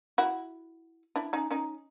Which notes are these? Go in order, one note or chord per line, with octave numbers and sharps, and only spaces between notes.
E4 F#4
D4 E4
C#4 D#4
C#4 D#4